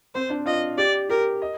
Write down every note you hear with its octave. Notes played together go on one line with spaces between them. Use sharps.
C4 C5
D4
F4 D#5
G4 D5
G4 A#4
D#5